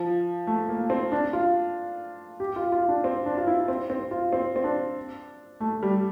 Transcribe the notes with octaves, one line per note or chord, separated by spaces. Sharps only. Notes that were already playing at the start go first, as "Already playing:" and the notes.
Already playing: F3
A3
A#3
C4
D4
F4
G4
F4
F4
D4
C4
D4
F4
E4
C4
C4
F4
C4
C4
D4
A3
G3